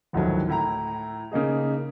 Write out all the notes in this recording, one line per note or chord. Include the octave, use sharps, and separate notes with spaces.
G#1 D2 A2 D#3 F3 F#3
A2 E4 G5 A#5
C#3 A#3 D#4 G#4